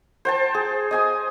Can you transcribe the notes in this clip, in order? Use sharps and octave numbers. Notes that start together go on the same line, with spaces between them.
C5 G5 A5
G#4
D#5 G#5 D#6